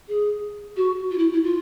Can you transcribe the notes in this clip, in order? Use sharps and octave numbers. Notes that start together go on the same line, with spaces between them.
G#4
F#4
F4
E4
E4
F4